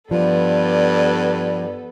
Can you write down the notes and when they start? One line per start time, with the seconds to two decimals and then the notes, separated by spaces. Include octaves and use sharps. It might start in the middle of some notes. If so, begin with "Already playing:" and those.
0.11 G2 F3 B3 A4 D5